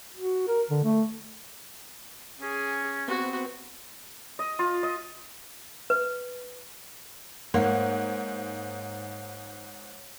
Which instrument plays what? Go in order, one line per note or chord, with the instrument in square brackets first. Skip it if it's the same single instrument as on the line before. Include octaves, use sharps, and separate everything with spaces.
[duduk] F#4
A#4
D3
A3
[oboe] C#4 [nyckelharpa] G#4
[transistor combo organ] B3 C4 [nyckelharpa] F#4
[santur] D#5
F4
D#5
[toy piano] B4
[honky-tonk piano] G#2 [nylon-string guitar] A#3 [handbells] C#5 F5 F#5